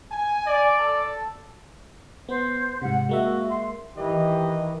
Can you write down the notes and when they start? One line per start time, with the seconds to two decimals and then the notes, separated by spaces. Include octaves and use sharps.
0.10 G#5
0.46 D5
0.79 A4 A5
2.29 B3 C5
2.82 G#2 C3 F#5
3.09 G#3 A#3 F#4 E5
3.49 C6
3.97 D#3 E3 G4 D#5